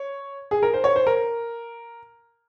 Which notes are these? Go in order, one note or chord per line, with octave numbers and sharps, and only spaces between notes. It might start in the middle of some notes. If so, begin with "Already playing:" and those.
Already playing: C#5
G#4
A#4
C5
C#5
C5
A#4